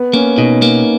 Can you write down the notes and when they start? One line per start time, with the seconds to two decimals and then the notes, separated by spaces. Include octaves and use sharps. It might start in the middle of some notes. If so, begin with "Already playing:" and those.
Already playing: B3
0.13 A#3 C#4
0.38 B2 D#4
0.62 A#3